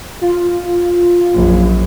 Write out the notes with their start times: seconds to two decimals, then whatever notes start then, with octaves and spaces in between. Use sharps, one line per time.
0.21 F4
1.33 A#1 F#2